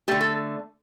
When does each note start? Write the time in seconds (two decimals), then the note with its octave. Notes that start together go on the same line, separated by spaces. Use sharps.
0.08 D3 A3 G4
0.21 A4